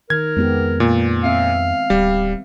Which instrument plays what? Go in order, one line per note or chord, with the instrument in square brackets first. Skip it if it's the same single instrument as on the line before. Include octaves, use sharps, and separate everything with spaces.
[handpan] D#3 [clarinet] A#4 [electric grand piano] G#6
[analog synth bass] F2 [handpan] G#3 B3 G4
[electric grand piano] A#2
[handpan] C4 E5 [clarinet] F5
[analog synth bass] D1 [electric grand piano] G3